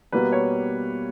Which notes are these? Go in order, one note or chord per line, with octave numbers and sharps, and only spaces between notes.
B2 G3 A#3 B4
C#5